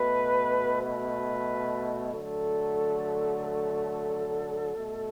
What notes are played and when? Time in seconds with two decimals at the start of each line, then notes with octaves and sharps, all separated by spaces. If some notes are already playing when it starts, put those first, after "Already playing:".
Already playing: B2 A3 B4
0.82 B4
2.13 D3 F#3 A3 A4
3.44 A4
4.75 B2 A3